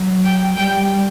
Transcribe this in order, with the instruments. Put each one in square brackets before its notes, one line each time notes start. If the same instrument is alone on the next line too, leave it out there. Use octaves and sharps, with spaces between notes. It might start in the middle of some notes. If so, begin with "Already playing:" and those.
Already playing: [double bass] F#3
[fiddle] G5
[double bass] G3 [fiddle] G5